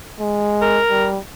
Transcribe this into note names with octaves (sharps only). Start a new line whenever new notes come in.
G#3
A#4
G3